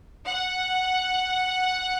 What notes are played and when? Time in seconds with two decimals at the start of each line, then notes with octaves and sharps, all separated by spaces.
0.25 F#5